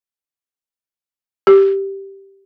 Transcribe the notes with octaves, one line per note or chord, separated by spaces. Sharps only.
G4